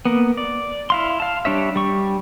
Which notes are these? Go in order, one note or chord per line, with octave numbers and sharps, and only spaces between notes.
A#3 B3
D5
E4 F5 C6
F5 A5
G3 D4 C#5 E5
G3 C#6